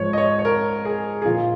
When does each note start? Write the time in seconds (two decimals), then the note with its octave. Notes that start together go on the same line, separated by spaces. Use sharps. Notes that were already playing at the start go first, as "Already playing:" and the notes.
Already playing: G#2 F3 C#5
0.13 D#5
0.18 C#5
0.39 C#5
0.45 A#4
0.85 G#4
1.22 G#4
1.25 A#2 F3 F4